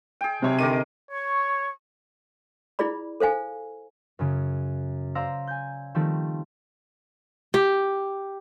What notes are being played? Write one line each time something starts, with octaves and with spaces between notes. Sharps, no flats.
G#4 G5
B1 C3 C4 C#5
D3 D#3 A#4 D6 D#7
C#5 C#6
E4 F4 G#4 D5 B5
A4 C5 F5 G#5
F#2 C#3
C5 D5 F5 A#5 E6
G#5 G6
D#3 F3 G3 A3 C4
G4